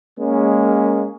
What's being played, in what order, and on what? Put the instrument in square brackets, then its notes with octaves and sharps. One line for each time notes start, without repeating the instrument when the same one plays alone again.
[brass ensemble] G#3 A#3 C#4